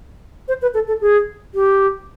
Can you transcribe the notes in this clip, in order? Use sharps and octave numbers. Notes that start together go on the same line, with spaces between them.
C5
B4
A4
A4
G#4
G4